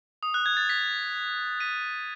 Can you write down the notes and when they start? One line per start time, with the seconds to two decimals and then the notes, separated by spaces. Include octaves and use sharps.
0.23 D#6
0.34 F#6
0.46 G#6
0.57 A6
0.69 B6
1.60 B6 D#7